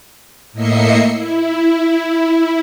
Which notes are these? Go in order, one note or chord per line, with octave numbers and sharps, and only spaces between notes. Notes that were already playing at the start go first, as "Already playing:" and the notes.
A2 A#3 D#5 E5 C7 C#7
E4